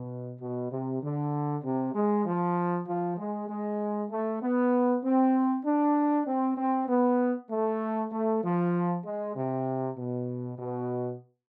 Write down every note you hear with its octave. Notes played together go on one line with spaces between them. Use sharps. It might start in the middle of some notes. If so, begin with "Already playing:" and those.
Already playing: B2
B2
C3
D3
C3
G#3
F3
F3
G#3
G#3
A3
B3
C4
D4
C4
C4
B3
A3
A3
F3
G#3
C3
B2
B2